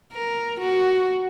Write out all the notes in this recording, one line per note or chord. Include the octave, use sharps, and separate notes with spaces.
A#4
F#4